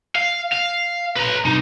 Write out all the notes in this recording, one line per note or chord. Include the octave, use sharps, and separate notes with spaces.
F5
F5
B4 A#5
C2 D#4